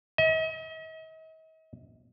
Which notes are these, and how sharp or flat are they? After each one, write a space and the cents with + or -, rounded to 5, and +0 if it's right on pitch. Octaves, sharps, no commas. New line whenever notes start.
D#5 +45